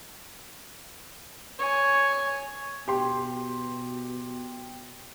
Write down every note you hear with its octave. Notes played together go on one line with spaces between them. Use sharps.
C#5 G#5
B2 G4 C6